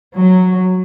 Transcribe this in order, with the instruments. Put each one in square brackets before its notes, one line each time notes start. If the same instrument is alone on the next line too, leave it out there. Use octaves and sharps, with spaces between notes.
[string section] F#3